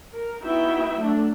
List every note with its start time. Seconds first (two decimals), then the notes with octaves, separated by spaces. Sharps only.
0.15 A#4
0.44 B3 D#4 E4 F#4 E5 G5
0.99 F#3 A3 D4